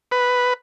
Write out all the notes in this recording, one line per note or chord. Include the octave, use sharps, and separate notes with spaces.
B4